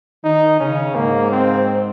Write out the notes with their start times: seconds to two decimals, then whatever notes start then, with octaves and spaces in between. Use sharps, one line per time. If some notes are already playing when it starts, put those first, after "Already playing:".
0.24 D#3 D#4
0.60 C#3 C#4
0.95 G#2 A#3
1.32 C4